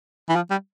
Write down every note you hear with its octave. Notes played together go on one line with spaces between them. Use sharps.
E3
F3
G3